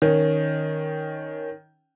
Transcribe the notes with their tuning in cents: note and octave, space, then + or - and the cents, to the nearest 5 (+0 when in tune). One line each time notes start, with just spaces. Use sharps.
D#3 +0 C#4 +0